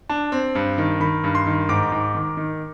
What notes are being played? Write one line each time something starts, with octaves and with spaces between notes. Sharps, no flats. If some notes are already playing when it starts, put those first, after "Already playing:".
D4
C4
G2
D#3
D#3 B5
G2
C6
D#3
G#2 D6
G#2
D#3
D#3